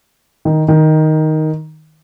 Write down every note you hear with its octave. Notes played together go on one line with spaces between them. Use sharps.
D#3
D#3